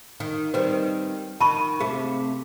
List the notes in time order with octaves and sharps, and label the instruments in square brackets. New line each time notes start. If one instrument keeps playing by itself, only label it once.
[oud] D#3
[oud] D#3 G3 C4 [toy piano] B4
[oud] D#3 [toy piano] A5 B5 C#6
[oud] C3 A3 [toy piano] G#4